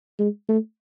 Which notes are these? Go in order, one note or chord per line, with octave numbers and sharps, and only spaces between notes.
G#3
A3